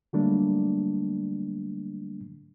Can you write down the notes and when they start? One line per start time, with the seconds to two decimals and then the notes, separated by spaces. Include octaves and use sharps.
0.13 D3 F#3 G3 A3 A#3 D4